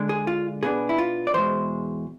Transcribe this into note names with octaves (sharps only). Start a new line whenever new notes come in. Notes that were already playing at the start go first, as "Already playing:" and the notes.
Already playing: D3 G#3 D4
G#4
F4
B2 B3 D4 G#4
E4
F4
D5
E2 B2 G#3 C5